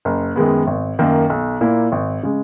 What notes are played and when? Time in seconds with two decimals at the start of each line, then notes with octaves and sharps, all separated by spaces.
0.05 F#1
0.36 F#2 D#3 G#3 B3
0.67 G#1
0.99 F#2 D#3 A#3
1.30 B1
1.61 A#2 A#3 E4
1.92 G#1
2.23 C#3 G#3